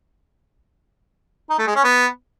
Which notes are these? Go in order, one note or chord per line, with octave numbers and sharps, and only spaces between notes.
D#4
A3
G#3
C#4
B3